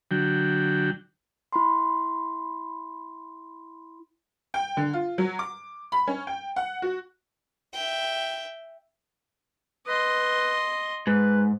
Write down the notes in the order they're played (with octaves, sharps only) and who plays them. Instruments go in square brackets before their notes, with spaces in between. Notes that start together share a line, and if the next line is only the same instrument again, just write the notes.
[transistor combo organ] D3 F#3 G5
[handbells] E4 B5 C6
[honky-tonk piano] G5
D3
F4
F#3
D6
B5
C#4
G5
F#5
F#4
[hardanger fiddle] E5 G5
[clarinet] B4 [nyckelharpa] D#5 C6
[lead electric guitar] G#2 [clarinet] B4